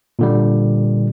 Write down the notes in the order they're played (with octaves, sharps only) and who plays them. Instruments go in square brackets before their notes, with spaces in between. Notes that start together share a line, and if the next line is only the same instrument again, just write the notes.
[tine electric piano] A#2 D3 G3